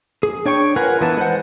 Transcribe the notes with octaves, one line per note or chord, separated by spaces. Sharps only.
G#4
D4 C#5 G5 C#6
F4 A#4 B4 F#5 G#5
E3 B3 A5
G#3 B4 C5 F#5